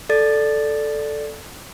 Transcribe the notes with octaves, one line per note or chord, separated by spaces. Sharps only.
A4 D5 A6